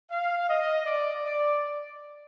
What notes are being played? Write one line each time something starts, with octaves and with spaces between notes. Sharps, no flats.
F5
D#5
D5
D5